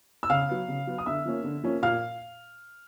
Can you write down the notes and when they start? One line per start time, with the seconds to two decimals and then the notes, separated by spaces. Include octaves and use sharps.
0.23 E6
0.30 C#3 F5 F6
0.49 F#3 B3
0.68 C#3
0.87 F#3 B3
0.98 D#6
1.06 D3 E5 E6
1.25 F3 A#3 C#4
1.44 D3
1.63 F3 A#3 C#4
1.83 A#2 F5 F6